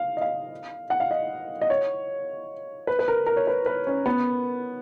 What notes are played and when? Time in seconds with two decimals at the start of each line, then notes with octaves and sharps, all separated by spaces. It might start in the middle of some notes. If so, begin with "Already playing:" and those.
Already playing: F5
0.17 D#5
0.21 F5
0.90 F#5
1.00 F5
1.11 D#5
1.62 D#5
1.70 C#5
2.87 B4
2.99 B4
3.08 A#4
3.26 A#4
3.37 C#5
3.47 B4
3.66 B4
3.87 C#4
4.06 B3